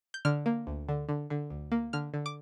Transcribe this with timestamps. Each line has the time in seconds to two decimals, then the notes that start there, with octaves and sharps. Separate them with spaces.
0.14 G6
0.25 D3 F6
0.46 A#3
0.67 D2
0.89 D3
1.09 D3
1.30 D3
1.50 D2
1.72 A#3
1.93 D3 F6
2.14 D3
2.26 D6